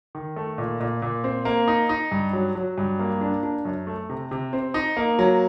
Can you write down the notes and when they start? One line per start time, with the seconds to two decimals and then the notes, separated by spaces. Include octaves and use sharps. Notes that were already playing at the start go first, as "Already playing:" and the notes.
0.15 D#3
0.36 A3
0.58 A#2
0.80 A#2
1.02 A#2
1.24 C4
1.45 A#3
1.68 D#4
1.89 D#4
2.11 G2
2.33 F#3
2.55 F#3
2.78 G2
2.99 A#3
3.21 D4
3.43 D4
3.65 F#2
3.87 A3
4.09 C3
4.31 C3
4.53 C4
4.74 D#4
4.97 A#3
5.19 F#3